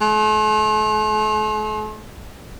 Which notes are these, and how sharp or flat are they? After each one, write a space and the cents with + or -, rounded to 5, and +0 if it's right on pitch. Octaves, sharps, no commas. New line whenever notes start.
A3 -45